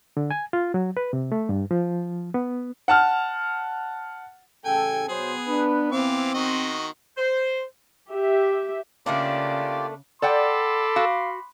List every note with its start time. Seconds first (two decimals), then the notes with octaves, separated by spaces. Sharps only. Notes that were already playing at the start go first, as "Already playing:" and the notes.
0.17 D3
0.31 G#5
0.53 F4
0.74 F#3
0.97 B4
1.13 C3
1.32 A3
1.49 G2
1.71 F3
2.34 B3
2.88 F#5 A5 F6
4.65 A1 C#3 A4 G5 G#5
5.09 B2 F#3 B3 G#4 C5
5.48 D4 B4
5.92 E3 C4 F5 D6
6.34 D#3 F#4 D#5 C6
7.17 C5
8.12 G4 E5
9.06 C#3 A3 A#3 D4 F4 G4 D5
10.22 A4 D5 F#5 G5 B5 C6 D6
10.96 F#4 F5